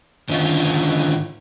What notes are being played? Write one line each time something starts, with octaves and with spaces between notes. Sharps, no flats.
G#2 D3 D#3 C#4 E4 F4